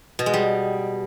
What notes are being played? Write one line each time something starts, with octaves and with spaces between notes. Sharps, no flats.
B2
G#3
G3